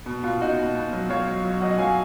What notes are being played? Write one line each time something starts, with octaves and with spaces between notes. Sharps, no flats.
B2
B2 F4
B2 D#4 F#4
B2
B2
F#3
F#3 C#5 F5
F#3
F#3
F#3 D#5 F#5
F#3 F5 G#5